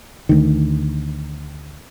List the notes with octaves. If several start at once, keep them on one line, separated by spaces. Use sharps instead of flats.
D2 D#3